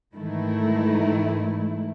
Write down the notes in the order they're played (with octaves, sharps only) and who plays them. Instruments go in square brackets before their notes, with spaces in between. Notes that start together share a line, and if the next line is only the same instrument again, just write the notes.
[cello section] G#2 D#3 E3 A3 E4